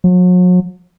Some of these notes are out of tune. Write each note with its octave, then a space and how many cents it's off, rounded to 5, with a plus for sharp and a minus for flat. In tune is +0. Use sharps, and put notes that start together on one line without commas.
F#3 -40